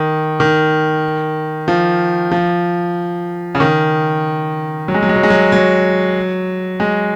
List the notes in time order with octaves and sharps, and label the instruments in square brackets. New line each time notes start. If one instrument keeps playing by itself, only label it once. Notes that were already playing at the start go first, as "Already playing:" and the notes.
Already playing: [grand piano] D#3
D#3
F3
F3
C#3
D#3
F#3
G#3
F#3
G#3
F#3
G#3
F#3
F#3
G#3